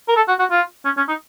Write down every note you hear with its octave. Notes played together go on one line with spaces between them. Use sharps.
A#4
A4
F#4
F#4
F4
C#4
C#4
D#4